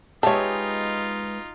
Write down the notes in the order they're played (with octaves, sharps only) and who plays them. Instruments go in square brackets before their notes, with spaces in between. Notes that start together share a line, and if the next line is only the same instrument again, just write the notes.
[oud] G#3 B3 E5 [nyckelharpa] D#4 F4 [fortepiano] G4 C#5 [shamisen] A5